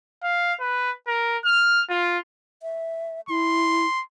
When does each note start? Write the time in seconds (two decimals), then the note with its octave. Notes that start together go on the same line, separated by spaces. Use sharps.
0.24 F5
0.60 B4
1.08 A#4
1.45 F6
1.90 F4
2.62 E5
3.29 E4 C6